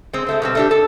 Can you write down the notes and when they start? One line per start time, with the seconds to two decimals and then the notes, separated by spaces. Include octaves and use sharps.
0.13 G#3 C4
0.27 G#3 A3 C4
0.42 B2 G3 C4
0.55 A3 D4 G4
0.71 A4